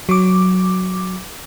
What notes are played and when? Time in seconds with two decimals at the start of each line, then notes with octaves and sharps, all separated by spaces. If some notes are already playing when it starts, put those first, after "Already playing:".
0.09 F#3 D6